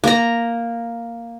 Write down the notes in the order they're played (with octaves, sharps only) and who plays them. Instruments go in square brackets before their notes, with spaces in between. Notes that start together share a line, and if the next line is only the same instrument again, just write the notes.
[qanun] A#3 A#5